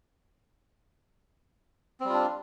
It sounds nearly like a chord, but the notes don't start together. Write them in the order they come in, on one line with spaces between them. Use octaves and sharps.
C4 G3 F4 D4